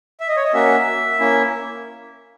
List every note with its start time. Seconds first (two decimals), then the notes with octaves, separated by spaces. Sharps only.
0.20 E5
0.28 D#5
0.37 C#5
0.45 D#5
0.53 A#3 C#4 F#4 E5
1.20 A#3 C#4 E4